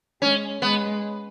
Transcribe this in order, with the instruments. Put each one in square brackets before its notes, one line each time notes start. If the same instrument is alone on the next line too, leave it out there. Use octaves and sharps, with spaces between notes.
[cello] G#3 [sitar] C#4
[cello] G#3 [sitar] B3